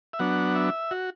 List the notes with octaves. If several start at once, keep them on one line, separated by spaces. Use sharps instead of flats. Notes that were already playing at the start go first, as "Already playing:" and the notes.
E5
F#3 B3 D4 F#5
E5
F#4